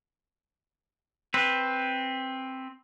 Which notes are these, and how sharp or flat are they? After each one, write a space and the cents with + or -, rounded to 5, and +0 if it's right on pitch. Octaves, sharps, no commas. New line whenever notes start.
C4 +5 B4 +0